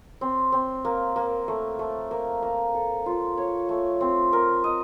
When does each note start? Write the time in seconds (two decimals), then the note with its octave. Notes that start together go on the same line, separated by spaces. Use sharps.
0.21 C4
0.52 C4
0.85 A#3
1.16 A#3
1.48 A3
1.79 A3
2.11 A#3
2.43 A#3
2.74 A4
3.06 F4
3.38 C#5
3.69 A3
4.01 C4
4.33 A#4
4.64 D#5